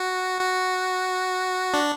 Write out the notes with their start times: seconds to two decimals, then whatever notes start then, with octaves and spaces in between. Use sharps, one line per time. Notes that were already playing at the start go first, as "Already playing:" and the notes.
Already playing: F#4
0.41 F#4
1.74 D4